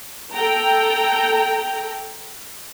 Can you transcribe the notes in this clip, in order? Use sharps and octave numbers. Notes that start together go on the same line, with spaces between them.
A4 G5 A#5